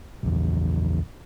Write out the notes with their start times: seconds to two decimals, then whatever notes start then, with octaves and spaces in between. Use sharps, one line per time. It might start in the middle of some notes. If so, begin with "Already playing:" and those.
0.23 A#1 E2